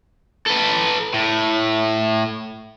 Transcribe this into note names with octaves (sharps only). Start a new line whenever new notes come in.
A4 B4
A2